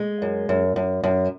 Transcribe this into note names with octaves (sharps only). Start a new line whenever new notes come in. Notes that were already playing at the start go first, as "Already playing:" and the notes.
Already playing: G#3
F#2
F#2
F#2
F#2